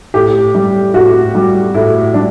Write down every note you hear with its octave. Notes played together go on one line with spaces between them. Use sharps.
A2 G4
G3
A2 F#4
G3
A2 E4
G3 D4